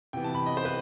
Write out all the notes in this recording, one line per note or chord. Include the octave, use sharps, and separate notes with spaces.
C3 E3 B3 G5
A5
B5
D#5
C5
B4